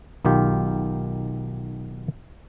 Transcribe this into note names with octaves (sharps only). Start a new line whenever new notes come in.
B1 D#3 F4 G4